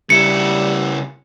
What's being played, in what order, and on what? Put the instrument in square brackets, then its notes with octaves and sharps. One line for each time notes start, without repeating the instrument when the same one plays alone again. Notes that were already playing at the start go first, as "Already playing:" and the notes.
[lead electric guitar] C#3 E4 [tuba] G3 [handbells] C#7